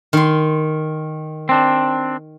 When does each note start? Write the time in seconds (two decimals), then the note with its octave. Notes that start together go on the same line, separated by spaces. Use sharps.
0.13 D#3 C6
1.49 C4 D4